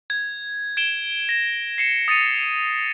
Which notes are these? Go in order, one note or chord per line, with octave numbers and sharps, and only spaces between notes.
G#6
G#6 D7 E7 G7
A#6 E7
C7 C#7 E7
D#6 A6 C#7 D#7